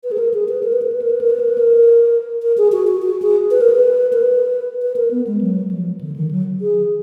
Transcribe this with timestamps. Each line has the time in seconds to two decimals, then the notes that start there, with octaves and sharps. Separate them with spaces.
0.04 B4
0.11 G#4
0.18 A#4
0.34 G#4
0.49 B4
0.63 A#4
0.73 B4
0.82 A#4
0.92 B4
1.02 A#4
1.11 B4
1.21 A#4
1.30 B4
1.39 A#4
1.49 B4
1.58 A#4
2.42 A#4
2.58 G#4
2.72 F#4
2.87 F#4
3.02 F#4
3.22 G#4
3.51 B4
3.61 A#4
3.70 B4
4.13 A#4
4.22 B4
4.82 B4
4.96 A#4
5.11 B3
5.27 G#3
5.41 F#3
5.71 F3
6.01 D3
6.16 D#3
6.31 F#3
6.61 G#4